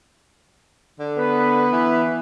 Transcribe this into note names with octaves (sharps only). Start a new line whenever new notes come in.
D3
B3 B4
E3